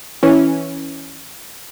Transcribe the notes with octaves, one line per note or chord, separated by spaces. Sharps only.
E3 C#4